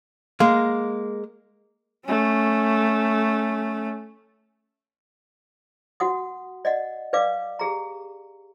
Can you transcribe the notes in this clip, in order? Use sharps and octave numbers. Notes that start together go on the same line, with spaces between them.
G#3 A#3
A3 C#4
F#4 F#5 D#6
D5 D#5 F#5
B4 D5 F5 D6
G4 G#4 A#5